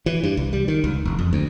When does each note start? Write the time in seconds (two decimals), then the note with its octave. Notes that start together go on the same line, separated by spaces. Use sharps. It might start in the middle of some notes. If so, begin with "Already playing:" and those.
0.06 E3
0.23 G2
0.37 C2
0.53 G3
0.68 D#3
0.84 C#2
1.05 E1
1.19 F2
1.33 D2